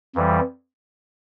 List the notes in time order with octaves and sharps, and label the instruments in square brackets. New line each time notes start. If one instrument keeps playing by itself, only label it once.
[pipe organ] F2 E3 G3